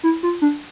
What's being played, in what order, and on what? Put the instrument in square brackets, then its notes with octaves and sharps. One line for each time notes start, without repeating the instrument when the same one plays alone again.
[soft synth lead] E4
F4
D4